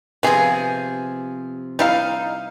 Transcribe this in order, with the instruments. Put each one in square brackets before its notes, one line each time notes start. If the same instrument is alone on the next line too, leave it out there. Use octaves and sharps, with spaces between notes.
[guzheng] C3 F3 [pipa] B3 G#4
[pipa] G3 E4 F5 [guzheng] D#4